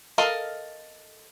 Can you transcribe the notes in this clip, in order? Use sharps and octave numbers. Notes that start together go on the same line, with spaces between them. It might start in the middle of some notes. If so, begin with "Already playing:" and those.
A4 A#4 D#5 F5